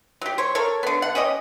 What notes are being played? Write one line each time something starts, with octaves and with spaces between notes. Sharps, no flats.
F#3 G4
C5 C#5
A4 A#4 C#5
D3 B3
F#5
C#4 G4 C#5 D#5